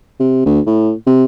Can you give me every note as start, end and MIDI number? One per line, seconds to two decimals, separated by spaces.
0.20 0.45 48
0.46 0.60 38
0.67 0.92 45
1.07 1.25 48